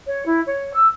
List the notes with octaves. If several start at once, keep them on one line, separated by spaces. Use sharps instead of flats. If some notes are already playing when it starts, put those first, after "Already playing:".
C#5
E4
C#5
E6